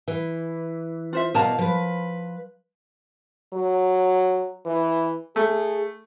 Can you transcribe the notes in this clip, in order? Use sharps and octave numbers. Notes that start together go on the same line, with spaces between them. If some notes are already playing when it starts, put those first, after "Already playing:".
E3
F4 C5 E5
E2 B2 A#4 F5 A5 A#5
F3 B4
F#3
E3
A3 G#4